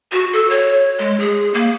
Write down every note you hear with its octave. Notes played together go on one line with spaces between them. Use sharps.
F#4
A4
C#5
G#3
G#4
A#3